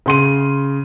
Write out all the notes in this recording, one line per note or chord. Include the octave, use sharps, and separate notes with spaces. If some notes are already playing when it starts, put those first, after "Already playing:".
C#3 C6 D#7